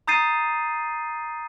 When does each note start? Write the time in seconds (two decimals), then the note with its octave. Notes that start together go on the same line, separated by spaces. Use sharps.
0.08 A#5 D#6 G6 A6 C7 D#7